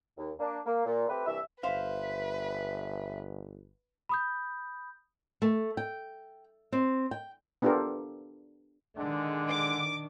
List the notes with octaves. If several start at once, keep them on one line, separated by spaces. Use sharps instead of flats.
D#2
A#3 D4
A#3
A#2
A3 C4 G4 B4
C2 G2 E3 E5
G1 B4 C5 E5 F5
B5 D#6 G6
A3
G5
C4
G5
B3 D4 F4 G4 A4 A#4
D3 D#3 G#3 D4
D6